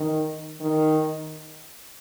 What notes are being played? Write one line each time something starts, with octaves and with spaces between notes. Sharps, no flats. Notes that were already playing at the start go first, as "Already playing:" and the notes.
Already playing: D#3
D#3